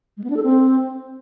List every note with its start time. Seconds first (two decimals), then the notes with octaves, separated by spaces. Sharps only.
0.17 G#3
0.24 B3
0.30 D4
0.37 A4
0.43 C4